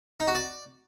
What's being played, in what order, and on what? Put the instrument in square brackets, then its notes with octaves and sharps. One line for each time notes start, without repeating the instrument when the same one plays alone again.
[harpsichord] D#4
F#4
D5